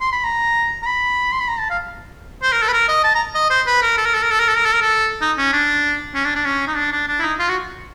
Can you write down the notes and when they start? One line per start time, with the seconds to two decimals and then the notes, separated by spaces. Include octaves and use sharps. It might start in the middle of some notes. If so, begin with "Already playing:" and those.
0.01 C6
0.13 B5
0.24 A#5
0.82 A#5
0.86 B5
1.32 C6
1.40 B5
1.49 A#5
1.59 A5
1.70 F5
2.43 C5
2.52 A#4
2.62 A4
2.68 B4
2.73 A#4
2.88 D#5
3.04 A5
3.15 A#5
3.35 D#5
3.50 C5
3.67 B4
3.82 A#4
3.98 A4
4.06 A#4
4.15 A4
4.23 A#4
4.31 A4
4.40 A#4
4.48 A4
4.57 A#4
4.65 A4
4.74 A#4
4.82 A4
5.21 D#4
5.38 C#4
5.53 D4
6.15 C#4
6.25 D4
6.36 D4
6.45 C#4
6.67 D#4
6.77 D4
6.92 D4
7.08 D4
7.19 E4
7.23 D#4
7.39 F4
7.49 F#4